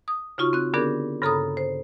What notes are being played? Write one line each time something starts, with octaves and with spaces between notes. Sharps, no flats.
D#6
C#3 D#4 F4 F#4 C#6
C4 F#6
D3 B3 D4 G4 G#4 A#4
G2 C#3 A4 A#5 B5 D#6
C5